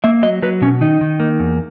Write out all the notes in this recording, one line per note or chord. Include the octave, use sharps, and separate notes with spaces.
A#3 E5
F#3 D#5
F#3 B4
B2 C#4
D#3 D#4
D#3
A#3
E2